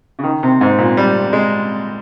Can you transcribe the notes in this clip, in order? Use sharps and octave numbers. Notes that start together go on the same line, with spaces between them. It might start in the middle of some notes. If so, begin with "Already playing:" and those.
C#3
D#3
C3
G#2
A#2
G3
G#3